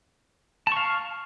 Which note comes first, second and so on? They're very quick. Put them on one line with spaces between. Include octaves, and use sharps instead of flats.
A5 C#6 F5